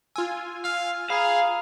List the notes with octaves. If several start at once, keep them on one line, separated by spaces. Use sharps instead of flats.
F4 G#5 E6
F5 F6
G#4 F5 A#5 B5